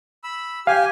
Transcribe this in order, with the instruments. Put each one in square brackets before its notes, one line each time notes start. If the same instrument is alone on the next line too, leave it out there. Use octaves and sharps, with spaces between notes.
[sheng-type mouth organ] B5 E6
[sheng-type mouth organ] G4 G#5 [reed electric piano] F5